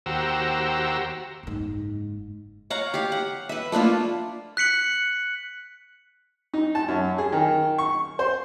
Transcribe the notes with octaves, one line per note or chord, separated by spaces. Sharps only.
D#2 F#4 G4 C5 A#5 E6
F#1 G#2
C#5 F5 F#5 A#5
G4 F5
F#5
B4 E5
A3 A#3 D4 F4
F#6 B6 C#7 F#7
D#4
A5
F#2
G#4
D#3
C#6
C5